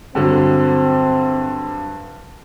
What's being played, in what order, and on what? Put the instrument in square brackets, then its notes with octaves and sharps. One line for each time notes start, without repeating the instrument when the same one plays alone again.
[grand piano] G2 D3 F#3 [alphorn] C4